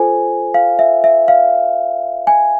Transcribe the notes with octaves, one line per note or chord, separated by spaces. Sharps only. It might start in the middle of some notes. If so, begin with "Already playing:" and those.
Already playing: F4 A4 C5 G#5
F5
E5
E5
F5
G#5